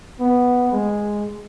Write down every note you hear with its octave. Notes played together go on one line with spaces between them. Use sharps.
B3
G#3